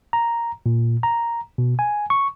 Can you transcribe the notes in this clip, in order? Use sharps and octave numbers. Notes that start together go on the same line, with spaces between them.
A#5
A#2
A#5
B2
G#5
C#6